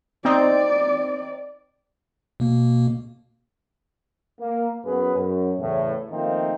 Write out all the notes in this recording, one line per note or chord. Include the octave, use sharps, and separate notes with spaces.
C4 D#4 D5
B2 A#3
A#3
F#2 B3 G#4 B4
F#2
E2 A2 C#3
D#3 F3 A3 A#3 C4 D#4